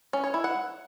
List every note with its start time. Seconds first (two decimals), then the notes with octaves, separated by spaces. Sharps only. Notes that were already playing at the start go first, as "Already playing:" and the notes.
0.13 C#4
0.24 C#5
0.34 E4
0.44 F#5